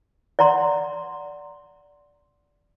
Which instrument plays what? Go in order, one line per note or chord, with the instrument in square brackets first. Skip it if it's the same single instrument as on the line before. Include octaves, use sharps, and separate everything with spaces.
[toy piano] D5 F#5 A#5 C6